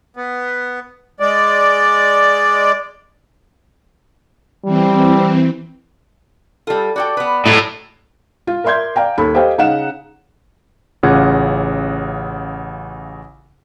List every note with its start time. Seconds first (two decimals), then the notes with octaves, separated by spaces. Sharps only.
0.16 B3
1.20 G#3 D5
4.65 E3 G3 C4
6.67 G3 F4 A4
6.96 F#4 A4 D5 G5
7.17 B3 B4
7.46 A2 F#3 G#3
8.47 F4
8.64 A#4 D5 E5 C6 G6 G#6
8.96 D5 F5 G5 A#5
9.18 D#2 A4 B5
9.35 G4 A4 C5 D#5 F5 G5
9.58 C#3 D#4 F5 F#5 E7
11.03 A1 C#3 F4 F#5 D6 G#6